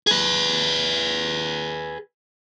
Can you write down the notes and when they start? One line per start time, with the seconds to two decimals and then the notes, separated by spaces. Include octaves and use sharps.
0.07 G#4 B4